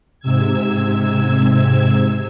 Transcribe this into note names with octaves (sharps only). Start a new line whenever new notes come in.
G#2 C3 E6 G#6